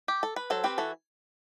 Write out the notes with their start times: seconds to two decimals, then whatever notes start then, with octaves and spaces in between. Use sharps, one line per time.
0.08 G4
0.23 A4
0.36 B4
0.50 F#3 A4 C5
0.64 C4 G4 B4
0.78 E3 F#4 A4